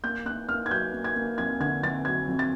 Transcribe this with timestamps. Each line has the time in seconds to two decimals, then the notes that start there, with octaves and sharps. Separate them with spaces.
0.04 A#3 G6
0.25 A#3 F#6
0.49 A#3 F6
0.66 G#6
0.70 F#3 G6
0.93 A#3
1.04 G#6
1.16 A#3
1.38 F2 G#6
1.60 D3 G#6
1.83 F2 A6
2.05 F#3 G#6
2.28 F2
2.39 A6